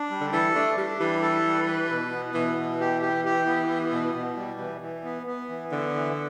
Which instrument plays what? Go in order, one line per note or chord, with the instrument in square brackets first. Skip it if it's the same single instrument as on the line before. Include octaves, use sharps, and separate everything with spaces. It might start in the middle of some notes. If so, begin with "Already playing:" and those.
Already playing: [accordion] D4
G3
[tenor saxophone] D3
[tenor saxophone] E3 [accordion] A4
[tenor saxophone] A3 [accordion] D4
[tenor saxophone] G3 [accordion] D4
[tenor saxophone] E3 [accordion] G3
[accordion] A4
G3
B4
B2
B3
[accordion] B2 [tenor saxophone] E3
[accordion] B2
G4
G4
G4
B3
B3
B2
B2
G3
E3
E3
B3
B3
E3
[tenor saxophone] D3 [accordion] B3
[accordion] E3